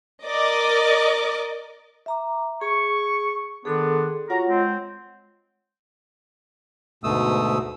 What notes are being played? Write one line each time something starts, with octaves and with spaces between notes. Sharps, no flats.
A#4 D5 D#5 D6
E5 A#5 D6
G#4 C#6
D#3 B3 D4 G#4 A4 C6
F4 F#4 C#5 F#5 A#5
G#3 C4
D2 G#2 B2 A3 D#6 E6